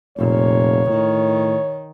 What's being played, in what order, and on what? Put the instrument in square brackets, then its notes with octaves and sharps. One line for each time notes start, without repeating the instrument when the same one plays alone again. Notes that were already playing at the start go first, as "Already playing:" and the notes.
[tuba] F1 [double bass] A#2 [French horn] C#5
[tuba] A2 [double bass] D#3